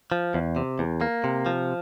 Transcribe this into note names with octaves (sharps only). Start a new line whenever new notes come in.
F3
E2
C3
E2
A#3
C3
F3